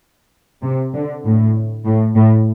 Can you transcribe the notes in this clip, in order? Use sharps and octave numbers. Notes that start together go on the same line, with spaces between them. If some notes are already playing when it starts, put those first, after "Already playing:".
C3
D3
A2
A2
A2